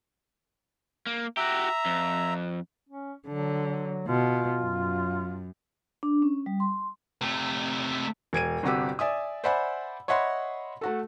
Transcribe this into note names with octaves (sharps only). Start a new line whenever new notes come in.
A#3
F#4 G4 E5 A#5
F2
C#4
D3 F#3
B2 F4
F#2
D4
C#4
G3
C6
C3 A3
E1 G#6 D7 D#7
G1 C3 F#4 G4 E6
D5 E5 G#5 D#6
C5 D5 E5 F#5 G#5 B5
C#5 D#5 E5 F#5 B5 C6
A3 F#4 A4